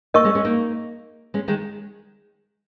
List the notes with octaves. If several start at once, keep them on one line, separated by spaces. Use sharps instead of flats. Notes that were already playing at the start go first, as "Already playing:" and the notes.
A#3 D#4 A#4 D#5 C#6
G#3 C#4
G#3 C#4
A#3 D#4
G#3 C#4
D#3 G#3